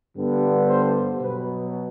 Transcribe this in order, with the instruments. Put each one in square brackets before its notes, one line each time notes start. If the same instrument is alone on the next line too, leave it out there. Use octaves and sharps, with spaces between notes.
[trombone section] G2 D3 G3 B3
C5
B2 F#3 B3 B4